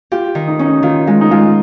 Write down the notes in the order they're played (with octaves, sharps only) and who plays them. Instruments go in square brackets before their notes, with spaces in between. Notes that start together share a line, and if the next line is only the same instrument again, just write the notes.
[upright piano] F4 [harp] G4
[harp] D#3
[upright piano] D#4
[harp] C#4
[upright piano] D#4
[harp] D#3 [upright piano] F4
[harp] G#3 [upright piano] F4
[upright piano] D#4
[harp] G#3 [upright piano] F4